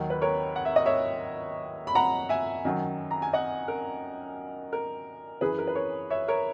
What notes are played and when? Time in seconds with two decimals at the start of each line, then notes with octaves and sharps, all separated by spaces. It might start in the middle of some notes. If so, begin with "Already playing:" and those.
Already playing: D#2 D#3 F#3 A#4
0.10 B4
0.22 A#4 C#5
0.56 F#5
0.65 E5
0.76 D#5
0.86 C#5 E5
1.87 B5
1.95 F#5 A#5
2.29 E5 G#5
2.65 F#2 D#3 F#3
3.11 A#5
3.22 G#5
3.33 D#5 F#5
3.68 A#4
4.73 A#4
5.41 F#2 E3 G#4 B4
5.58 A#4
5.67 B4
5.75 A#4 C#5
6.10 C#5 E5
6.28 A#4 C#5